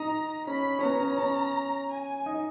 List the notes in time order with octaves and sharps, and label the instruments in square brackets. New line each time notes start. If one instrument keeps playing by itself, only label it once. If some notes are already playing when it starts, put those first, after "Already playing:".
Already playing: [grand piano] D#4 [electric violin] A#5
[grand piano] C#4 [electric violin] B5
[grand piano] C#4
[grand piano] B3 [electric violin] A#5
[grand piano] C#4
C#4
[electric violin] G#5
[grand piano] D#4